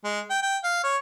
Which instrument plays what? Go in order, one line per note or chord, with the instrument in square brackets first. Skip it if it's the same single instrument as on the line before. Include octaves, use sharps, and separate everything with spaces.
[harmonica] G#3
G5
G5
F5
C#5